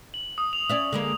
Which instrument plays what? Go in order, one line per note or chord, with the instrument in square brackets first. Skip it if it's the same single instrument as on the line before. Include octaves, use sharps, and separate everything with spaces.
[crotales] F#7
D#6
F7
[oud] C#4 D5 E5
D3 G#3 A#3